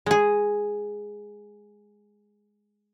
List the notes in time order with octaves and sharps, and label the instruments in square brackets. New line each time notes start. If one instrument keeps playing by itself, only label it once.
[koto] G#3 G#4